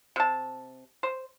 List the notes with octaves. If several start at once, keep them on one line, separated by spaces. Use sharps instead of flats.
C3 A5
C5